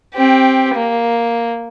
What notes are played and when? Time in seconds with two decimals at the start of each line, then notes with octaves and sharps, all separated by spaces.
0.14 C4 G4
0.74 A#3